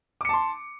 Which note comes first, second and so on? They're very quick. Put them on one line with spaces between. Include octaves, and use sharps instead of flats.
D6 C#7 A5 C6